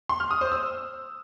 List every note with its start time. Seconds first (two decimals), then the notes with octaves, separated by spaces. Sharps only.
0.09 C6
0.20 F6
0.31 D#6
0.41 C5
0.52 E6